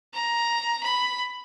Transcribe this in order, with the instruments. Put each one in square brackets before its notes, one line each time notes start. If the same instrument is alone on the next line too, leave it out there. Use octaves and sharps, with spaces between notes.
[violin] A#5
B5